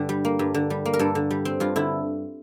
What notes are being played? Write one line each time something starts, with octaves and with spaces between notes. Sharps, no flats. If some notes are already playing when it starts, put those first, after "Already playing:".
Already playing: G2 D3 G4
G3
A#3
G2
D3
G3
A#3
A#4
G2 A4
D3
G3
C4
G2 F4
D3 E4